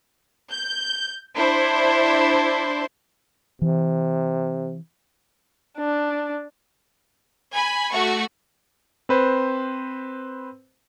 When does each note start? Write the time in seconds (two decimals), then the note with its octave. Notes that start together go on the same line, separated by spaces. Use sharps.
0.50 G6
1.36 D4 E4 C5
3.62 C3 E3
5.78 D4
7.54 G#5 B5
7.93 A3 F#4 C#6
9.09 C4 B4 C5